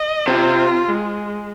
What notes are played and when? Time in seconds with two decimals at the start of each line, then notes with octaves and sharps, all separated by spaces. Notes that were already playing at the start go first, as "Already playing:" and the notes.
Already playing: D#5
0.28 C3 F4
0.88 G#3